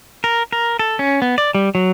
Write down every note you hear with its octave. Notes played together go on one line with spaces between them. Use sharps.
A#4
A#4
A4
C#4
B3
D5
G3
F#3